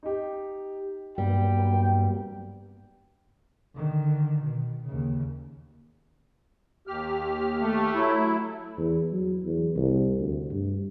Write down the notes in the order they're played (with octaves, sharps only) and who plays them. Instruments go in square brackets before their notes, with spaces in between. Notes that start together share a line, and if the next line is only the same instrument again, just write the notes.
[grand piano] D#4 G4
[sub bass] G2 [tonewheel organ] F#3 A#3 B3 [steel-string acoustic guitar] G3 [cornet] G5
[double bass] D3 D#3
B2
D#2 C#3
[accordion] D#2 G4 F6
[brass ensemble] A3
[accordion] F#3 E4
[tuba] E2
F#3
E2
C2
D2
G2